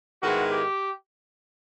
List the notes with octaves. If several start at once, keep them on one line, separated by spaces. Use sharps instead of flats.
G#2 D#3 G#3 B3 E4 F#4
G4